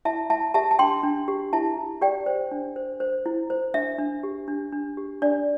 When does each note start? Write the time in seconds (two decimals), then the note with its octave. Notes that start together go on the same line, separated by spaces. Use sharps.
0.05 E4 E5 A5
0.30 E4 E5 A5
0.54 G4 E5 A5
0.71 A5
0.79 D4 G5 C6
1.03 D4
1.28 G4
1.53 E4 E5 A5
1.77 E4
2.01 G4 D5 G5
2.26 C5
2.51 D4
2.76 C5
3.00 C5
3.26 E4
3.50 C5
3.74 D4 E5
3.99 D4
4.23 G4
4.48 D4
4.72 D4
4.97 G4
5.22 D4 D5